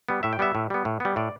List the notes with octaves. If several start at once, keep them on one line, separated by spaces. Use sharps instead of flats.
G3 B3
A2 E5
G5
G3 B3 E5
A2
G3 B3
A2
G3 B3
A2 D5